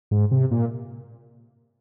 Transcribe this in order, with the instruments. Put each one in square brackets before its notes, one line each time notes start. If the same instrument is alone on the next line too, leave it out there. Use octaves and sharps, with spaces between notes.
[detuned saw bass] G#2
C3
A#2